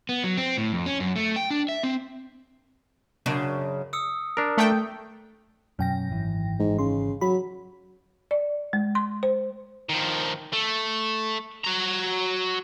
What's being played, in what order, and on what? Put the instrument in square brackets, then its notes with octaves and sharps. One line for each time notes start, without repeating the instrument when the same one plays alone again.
[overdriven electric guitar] B3
F#3
C4
A2
F2
C#4
F#2
A3
G5
D4
E5
C4
[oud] F#2 C#3 D4
[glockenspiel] D#6 E6 C#7
[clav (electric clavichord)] D4 A#4
[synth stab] A3 G5
[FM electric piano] F#2 G5 A#6 [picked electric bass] B2 F#3 C#4
[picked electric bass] G#1 E3
[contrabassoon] G#2
[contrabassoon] C#3 [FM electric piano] C6
[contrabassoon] F#3 [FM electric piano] B5
[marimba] D5
G#3
C6
C5
[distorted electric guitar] D#3 F3
A3
F#4 A#5